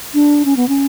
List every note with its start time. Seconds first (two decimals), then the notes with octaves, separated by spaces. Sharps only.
0.14 D4
0.45 C#4
0.57 B3
0.68 C#4